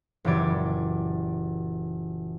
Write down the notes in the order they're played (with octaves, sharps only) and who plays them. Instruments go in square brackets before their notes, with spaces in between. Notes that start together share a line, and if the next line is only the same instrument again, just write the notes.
[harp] F#1 A#2 E3 G4 D5 G#6